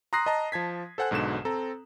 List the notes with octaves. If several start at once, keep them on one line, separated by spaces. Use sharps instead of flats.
A#5 C6 D#6 F#6 A#6 C7
D#5 A5 A#5
F3 A5 G#6 B6
A4 C5 F#5 G#5 F#6
B1 G#2 B2 D3 E7
C4 A4 A#5